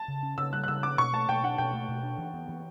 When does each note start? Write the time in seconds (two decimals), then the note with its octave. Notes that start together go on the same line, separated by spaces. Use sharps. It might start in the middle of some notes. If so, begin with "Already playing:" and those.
Already playing: A5
0.08 C#3
0.23 C#4
0.38 C#3 E6
0.53 G3 F#6
0.64 F#6
0.68 C#3 E6
0.83 C#4 D6
0.98 B2 C#6
1.13 A3 A5
1.29 B2 G5
1.44 D4 F#5
1.58 B2 G5
1.73 A3
1.89 B2
2.03 D4
2.18 E3
2.34 B3
2.49 E3